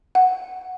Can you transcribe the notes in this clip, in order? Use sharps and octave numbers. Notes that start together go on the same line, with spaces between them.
F#5